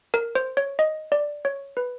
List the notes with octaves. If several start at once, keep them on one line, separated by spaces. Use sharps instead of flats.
A#4
C5
C#5
D#5
D5
C#5
B4